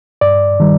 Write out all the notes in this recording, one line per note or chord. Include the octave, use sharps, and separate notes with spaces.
G2 D5
D#3 G3